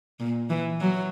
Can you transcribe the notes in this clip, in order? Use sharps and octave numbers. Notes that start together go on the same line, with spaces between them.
A#2
E3
F#3